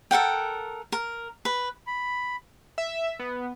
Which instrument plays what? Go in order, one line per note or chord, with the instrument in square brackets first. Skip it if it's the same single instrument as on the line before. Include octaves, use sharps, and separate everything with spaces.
[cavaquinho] A4 A#4 F#5 G5
A#4
B4
[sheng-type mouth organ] B5
[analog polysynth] E5
B3